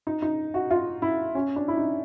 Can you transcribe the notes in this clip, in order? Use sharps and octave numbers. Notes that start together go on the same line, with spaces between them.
D#4
D#4
F#4
F4
E4
C#4
D4
E4
D#4